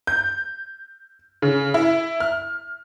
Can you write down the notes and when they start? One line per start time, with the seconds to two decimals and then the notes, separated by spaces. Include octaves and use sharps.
0.07 G6
1.42 C#3
1.74 E4
2.20 F6